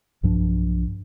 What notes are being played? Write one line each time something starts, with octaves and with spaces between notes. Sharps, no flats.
B1 G2 F3 D4